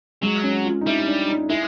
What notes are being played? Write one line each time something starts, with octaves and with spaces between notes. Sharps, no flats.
F#3 G#3
C#4
F4
D#4
G3 E4
D4
D#4
G#3 E4